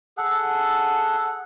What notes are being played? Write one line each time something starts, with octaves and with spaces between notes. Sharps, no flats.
G#4 A4 F#5